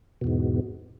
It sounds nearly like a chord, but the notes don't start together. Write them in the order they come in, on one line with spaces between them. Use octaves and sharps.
B2 E2 G#2